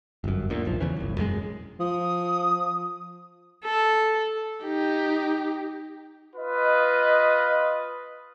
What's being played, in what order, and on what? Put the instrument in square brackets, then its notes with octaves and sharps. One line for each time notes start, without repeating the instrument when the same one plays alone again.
[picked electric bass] G1 F#2
G1 D2 A#2
F1 B1 F3
E2 C#3 E3
G1 C2
E1 F#2 F#3 G#3
[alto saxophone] F3 [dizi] D#6
[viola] A4
[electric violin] D#4 G4
[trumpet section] F4 B4 D#5